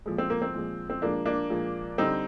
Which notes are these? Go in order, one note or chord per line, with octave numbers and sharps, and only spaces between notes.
A#2 F3 G#3
C4
A#3
C4
A#2 F3 G#3
C4
A#2 F3 G#3 A#3 D4
A#3 D4
A#2 F3 G#3
D3 G3 C4 D#4